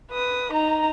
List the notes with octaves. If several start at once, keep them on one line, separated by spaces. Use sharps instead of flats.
B4 D#6
D#4 A#5